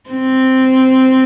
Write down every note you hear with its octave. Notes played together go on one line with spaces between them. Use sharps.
C4